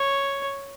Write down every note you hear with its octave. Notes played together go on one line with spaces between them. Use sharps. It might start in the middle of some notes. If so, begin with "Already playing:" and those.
Already playing: C#5